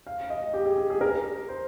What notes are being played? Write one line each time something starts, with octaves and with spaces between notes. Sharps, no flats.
F5
D#5
G4
G#4
G#4
G#4
A#4
C5